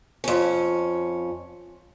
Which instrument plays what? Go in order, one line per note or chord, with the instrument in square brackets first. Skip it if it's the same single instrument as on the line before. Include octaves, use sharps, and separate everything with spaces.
[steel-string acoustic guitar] F2 C#4